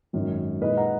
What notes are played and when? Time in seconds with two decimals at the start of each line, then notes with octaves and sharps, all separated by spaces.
0.13 G#1 F#2 D#3
0.61 A#2 G#3 D#4 B4 D#5
0.77 F#5 A#5